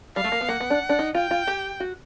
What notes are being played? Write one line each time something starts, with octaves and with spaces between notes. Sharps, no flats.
G3 F5
A3
A#3
B3
A#3 F#5
B3
D4
D4
D#4
F4 G5
F4
G4
F#4